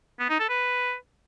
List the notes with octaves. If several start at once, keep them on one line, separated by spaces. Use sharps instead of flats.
B3
D#4
A4
B4